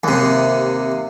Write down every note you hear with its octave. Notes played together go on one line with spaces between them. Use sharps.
D#2 C3